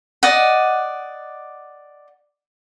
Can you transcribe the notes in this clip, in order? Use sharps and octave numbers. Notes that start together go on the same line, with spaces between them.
D5 D#5 F#5